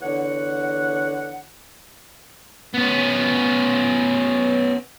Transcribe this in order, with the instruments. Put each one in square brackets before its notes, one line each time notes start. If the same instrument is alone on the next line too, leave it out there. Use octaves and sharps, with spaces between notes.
[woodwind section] E2 D3 C#5 F#5
[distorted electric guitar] B3 C#4